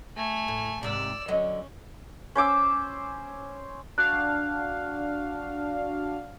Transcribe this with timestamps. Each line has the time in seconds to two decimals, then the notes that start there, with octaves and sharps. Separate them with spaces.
0.16 A3 G#5
0.48 A2
0.83 D#2 G#2 C3 D5 E6
1.28 D3 F#3 C#4 D#5
2.35 C#4 C5 D6 E6
3.98 D4 F#4 F5 F#6